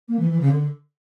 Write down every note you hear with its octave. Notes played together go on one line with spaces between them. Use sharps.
A#3
E3
E3
C#3
D3